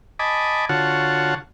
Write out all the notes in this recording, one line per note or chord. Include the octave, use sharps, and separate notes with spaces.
D#5 G#5 A5 B5 D6
D3 F4 F#4 C#5 F#5 A5